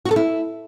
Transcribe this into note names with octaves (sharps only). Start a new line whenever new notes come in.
F#4
A4
E4